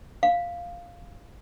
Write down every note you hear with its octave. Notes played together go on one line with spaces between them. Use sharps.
F5